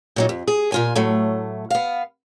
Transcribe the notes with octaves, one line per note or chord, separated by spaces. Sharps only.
A#2 F#3 D#4
F2
G#4
A#2 F4 G#5
A2 F#3 A3
B3 F5